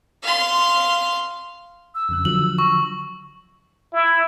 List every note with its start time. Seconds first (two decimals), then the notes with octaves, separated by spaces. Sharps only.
0.23 F5 C6
1.95 E6
2.09 F2 C#3 F#6
2.25 D3 F3 F#3 F#7
2.58 C#6
3.93 E4